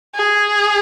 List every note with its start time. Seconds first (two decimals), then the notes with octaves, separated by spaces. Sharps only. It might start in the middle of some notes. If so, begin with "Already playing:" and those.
0.15 G#4